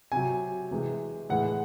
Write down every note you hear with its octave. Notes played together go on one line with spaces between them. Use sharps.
C3 F#3 G#5
C3 E3 G#3
A2 E3 G#3 F#5